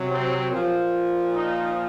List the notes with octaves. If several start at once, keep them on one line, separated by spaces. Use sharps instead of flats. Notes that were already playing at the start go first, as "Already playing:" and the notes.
Already playing: C3 F#3
C4
A#2 F3
D#4